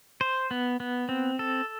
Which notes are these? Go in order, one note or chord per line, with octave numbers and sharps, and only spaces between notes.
C5
B3
B3
C4
A4